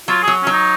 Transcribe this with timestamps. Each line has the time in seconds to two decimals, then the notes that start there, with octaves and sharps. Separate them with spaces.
0.08 F#3 F4
0.23 F#3 G#4
0.43 C#4
0.47 F#3
0.52 D#4